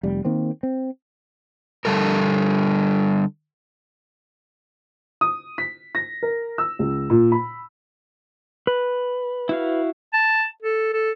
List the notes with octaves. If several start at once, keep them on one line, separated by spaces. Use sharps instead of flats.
F1 G3
D#3 A#3 C4
C4
D3 G3 A4 A#4
D#6
B6
A#6
A#4
E6
C#2
A#2
B5
B4
E4 F#4 F5
A5
A4
A4